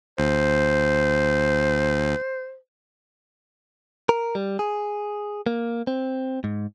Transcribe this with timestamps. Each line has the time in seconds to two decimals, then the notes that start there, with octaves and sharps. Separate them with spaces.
0.18 D2 C5
4.09 A#4
4.35 G3
4.59 G#4
5.46 A#3
5.87 C4
6.44 G#2